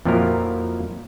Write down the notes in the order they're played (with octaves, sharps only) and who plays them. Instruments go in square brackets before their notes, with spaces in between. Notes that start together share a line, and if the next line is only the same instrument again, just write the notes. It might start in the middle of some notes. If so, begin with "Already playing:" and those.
[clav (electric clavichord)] F2 A#2 F3 F#3 E4 A#4